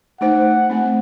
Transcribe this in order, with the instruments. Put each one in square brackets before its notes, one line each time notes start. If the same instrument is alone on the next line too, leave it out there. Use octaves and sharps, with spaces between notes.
[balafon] A3 D#4 C5 [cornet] F#5
[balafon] A3 C4